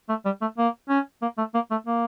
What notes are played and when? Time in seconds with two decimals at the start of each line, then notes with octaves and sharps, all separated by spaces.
0.09 A3
0.25 G3
0.41 A3
0.58 A#3
0.89 C#4
1.22 A#3
1.38 A3
1.54 A#3
1.71 A3
1.87 A#3